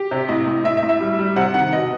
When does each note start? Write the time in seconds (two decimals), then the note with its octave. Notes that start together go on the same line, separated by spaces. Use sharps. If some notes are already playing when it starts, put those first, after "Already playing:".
Already playing: G4
0.11 C3
0.29 A2 D#5
0.47 A2
0.64 A2 E5
0.77 E5
0.83 A2
0.89 E5
1.00 G3
1.19 G3
1.36 C3 F#5
1.54 D#3 F#5
1.73 B2 D#5